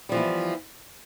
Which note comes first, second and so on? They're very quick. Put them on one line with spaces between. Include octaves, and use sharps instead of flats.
G3 F3 E3 E4 B3